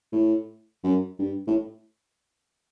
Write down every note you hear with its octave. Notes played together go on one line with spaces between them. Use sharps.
A2
F#2
G2
A2